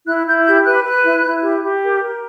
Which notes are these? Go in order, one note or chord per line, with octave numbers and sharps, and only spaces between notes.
E4 F#6
E4 G6
G4 G6
B4 F#6
B4 F#6
E4
E4
G4
G4
A#4
A#4